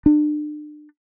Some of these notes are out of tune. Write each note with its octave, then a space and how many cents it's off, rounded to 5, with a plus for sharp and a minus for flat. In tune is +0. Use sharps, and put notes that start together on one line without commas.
D4 +35